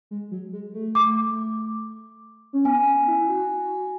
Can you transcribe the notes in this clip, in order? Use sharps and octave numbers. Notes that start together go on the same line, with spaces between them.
G#3
F#3
G#3
A3
D6
C#4
B3 G#5
E4
F#4